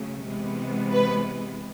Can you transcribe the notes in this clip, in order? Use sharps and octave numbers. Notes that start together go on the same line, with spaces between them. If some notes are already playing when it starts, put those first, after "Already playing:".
Already playing: C#3 F#3 A3
C3 E3 G#3 B3
B4